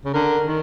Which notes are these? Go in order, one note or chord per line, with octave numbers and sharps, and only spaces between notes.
C#3
D3 A#4
D#3